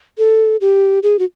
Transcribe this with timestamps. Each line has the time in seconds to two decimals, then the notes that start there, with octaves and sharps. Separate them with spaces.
0.18 A4
0.61 G4
1.03 G#4
1.19 F#4